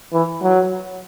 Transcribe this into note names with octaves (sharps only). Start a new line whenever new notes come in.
E3
F#3